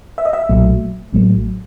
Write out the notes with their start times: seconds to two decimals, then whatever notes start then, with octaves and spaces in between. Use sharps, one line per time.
0.18 E5
0.25 D#5
0.33 E5
0.49 B1 A#2 F#3 A3
1.13 A1 A2 F#3 A3